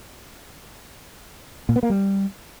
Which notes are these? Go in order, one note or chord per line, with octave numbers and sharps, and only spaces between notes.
A#2
B3
A#3
G3